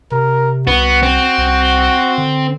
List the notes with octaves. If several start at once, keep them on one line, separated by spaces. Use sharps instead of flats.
C3 A#4
C2 B3 F#4
C4
C2
D3